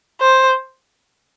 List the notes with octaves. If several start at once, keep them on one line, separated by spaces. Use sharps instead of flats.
C5